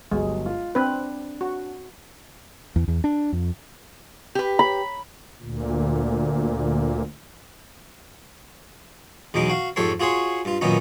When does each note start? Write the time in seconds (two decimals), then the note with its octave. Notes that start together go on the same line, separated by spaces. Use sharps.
0.12 G1 F#3 G#3
0.46 F4
0.75 C4 D4 B4
1.41 F#4
2.76 E2
2.88 E2
3.04 D4
3.32 F2
4.35 G4 B4
4.59 B5
5.42 D2 A#2
9.34 E2 B2 F#3 G#3 D#4 D6
9.50 F#4 F5
9.76 F2 G#2 G4 A4 C#5 C6
10.00 F4 F#4 G#4 C#5 C6
10.45 G2 F4
10.61 F#2 A#2 D#3 B3 C#4 D#4